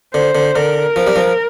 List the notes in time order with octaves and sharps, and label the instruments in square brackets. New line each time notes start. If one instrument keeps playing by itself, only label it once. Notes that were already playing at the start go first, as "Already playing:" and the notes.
[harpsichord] D3 [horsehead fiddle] C5
[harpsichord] D3
[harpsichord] D3 [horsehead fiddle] A#4
[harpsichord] F3
G3
F3